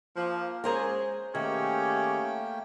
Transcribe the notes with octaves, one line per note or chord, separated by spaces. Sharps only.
F3 A#3
G#3 C#4 G#4 A#4 C5 A#5
D#3 A3 A#3 C#4 G4 G#4 G5